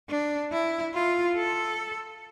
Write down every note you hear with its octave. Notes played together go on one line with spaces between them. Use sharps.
D4
E4
F4
A4